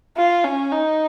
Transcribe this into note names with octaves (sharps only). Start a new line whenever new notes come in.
F4
C#4
D#4